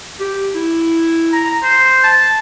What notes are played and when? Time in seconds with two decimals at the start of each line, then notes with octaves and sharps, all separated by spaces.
0.20 G4
0.54 E4
1.32 A#5
1.63 C5
2.04 A5